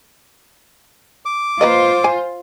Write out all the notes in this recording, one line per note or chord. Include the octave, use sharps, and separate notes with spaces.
D6
A#3 F4 B4 C5 D#5
G#5